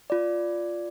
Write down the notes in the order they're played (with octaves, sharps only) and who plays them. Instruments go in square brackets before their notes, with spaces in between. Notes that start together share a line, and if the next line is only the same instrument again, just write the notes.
[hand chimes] F4 D5